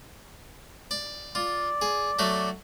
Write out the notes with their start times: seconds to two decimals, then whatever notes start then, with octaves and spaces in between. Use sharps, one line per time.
0.91 D5
1.35 F4 D5
1.81 G#4
2.19 F#3 A3 F#4